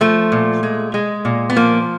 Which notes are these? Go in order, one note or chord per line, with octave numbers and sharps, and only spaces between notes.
F3 A3
A#2
G#3
G#3
A#2
B3
F3 A#3